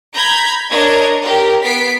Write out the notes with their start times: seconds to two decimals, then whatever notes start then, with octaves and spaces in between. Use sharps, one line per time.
0.14 A#5 B5 G6 G#6 B6
0.70 D4 A#4 C#5 D#5 G#6
1.21 G4 A#4
1.63 B3 B6 C7 D7